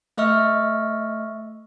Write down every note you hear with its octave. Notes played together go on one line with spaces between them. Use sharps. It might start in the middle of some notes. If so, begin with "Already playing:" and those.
A3 D#5 E5 C#6 F6